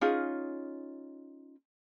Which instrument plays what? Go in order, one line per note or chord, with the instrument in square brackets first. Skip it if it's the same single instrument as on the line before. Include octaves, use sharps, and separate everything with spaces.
[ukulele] C#4 D#4 F4 G#4